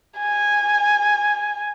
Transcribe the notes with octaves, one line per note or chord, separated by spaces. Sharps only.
G#5